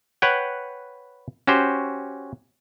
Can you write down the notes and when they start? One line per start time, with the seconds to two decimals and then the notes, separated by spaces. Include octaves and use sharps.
0.22 B4 C#5 F#5 G5
1.47 C#4 F#4 G4 C5